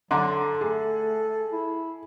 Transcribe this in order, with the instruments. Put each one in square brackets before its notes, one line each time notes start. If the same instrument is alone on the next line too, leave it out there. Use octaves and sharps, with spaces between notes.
[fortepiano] D3 [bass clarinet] F#3 [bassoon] A4 [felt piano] A#5 C6 D6
[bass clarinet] A3 [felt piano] G#4
[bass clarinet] E4